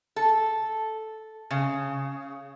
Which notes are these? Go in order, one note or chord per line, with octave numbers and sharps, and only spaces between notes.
A4
C#3